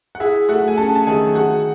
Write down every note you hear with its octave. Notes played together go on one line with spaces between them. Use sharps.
F#5
E4 G#4 E5
A3 F#4 F#5
G#5
C#4 A4 A5
A5
D#3 G#4 G#5
F#4 G#4 F#5